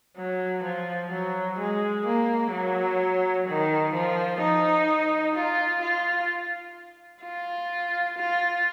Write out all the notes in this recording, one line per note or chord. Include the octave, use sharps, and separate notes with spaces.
F#3
F3
F#3
G#3
A#3
F#3
D#3
F3
D#4
F4
F4
F4
F4